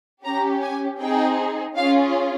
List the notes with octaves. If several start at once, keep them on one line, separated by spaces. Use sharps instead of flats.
C#4 G4 A#5
G#5
C4 D#4 G#4 G5
C#4 F4 G#4 F5